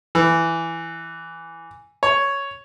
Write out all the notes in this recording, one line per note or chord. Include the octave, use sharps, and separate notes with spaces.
E3
C#5